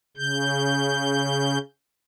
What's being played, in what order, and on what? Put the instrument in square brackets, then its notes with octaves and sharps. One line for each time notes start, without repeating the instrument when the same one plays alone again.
[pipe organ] C#3 G6